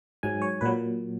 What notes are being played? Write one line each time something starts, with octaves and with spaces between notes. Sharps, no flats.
G#2 F#3 G#5
C#5
A#2 F#3 B4